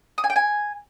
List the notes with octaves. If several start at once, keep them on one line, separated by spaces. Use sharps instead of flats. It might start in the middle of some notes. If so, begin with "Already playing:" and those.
D#6
G#5
G5
G#5